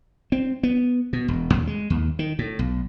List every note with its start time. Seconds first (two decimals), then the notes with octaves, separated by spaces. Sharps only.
0.32 C4
0.63 B3
1.13 B2
1.28 E1
1.53 D#2
1.67 G#3
1.90 D#2
2.19 D#3
2.39 A2
2.59 B1